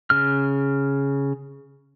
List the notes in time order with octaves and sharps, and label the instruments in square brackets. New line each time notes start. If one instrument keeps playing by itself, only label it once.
[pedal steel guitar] C#3 F6